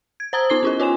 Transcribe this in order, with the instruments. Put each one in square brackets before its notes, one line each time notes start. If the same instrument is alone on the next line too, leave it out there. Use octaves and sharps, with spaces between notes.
[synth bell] G#6
C5 A5 A#5 D#6 E6 G#6
B3 D#4 D6 C7 G7
C#4 E4 A4
F4 C#5 G#5 C6 E7